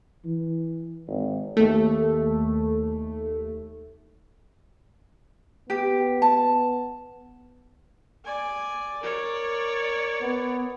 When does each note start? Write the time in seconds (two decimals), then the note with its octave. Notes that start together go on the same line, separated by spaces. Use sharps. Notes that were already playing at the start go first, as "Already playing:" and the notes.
0.25 E3
1.08 G#1
1.57 D#2 A3
5.70 B3 G4
6.22 A5
8.25 D5 G#5
9.03 A#4 C#5 D5
10.22 B3